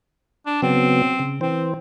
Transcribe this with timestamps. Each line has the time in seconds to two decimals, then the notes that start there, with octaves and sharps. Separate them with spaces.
0.46 D4
0.62 C#3 F#3 B3 C4
1.19 C#3
1.41 E3 C4 C5